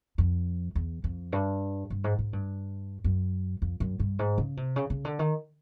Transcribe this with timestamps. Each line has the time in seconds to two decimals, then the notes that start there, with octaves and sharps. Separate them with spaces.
0.18 F2
0.75 E2
1.04 F2
1.32 G2
1.90 G2
2.04 G#2
2.19 G#2
2.33 G2
3.04 F#2
3.62 F2
3.80 F#2
3.99 G2
4.19 G#2
4.38 C#3
4.57 C3
4.76 C#3
4.90 C#3
5.05 D3
5.19 D#3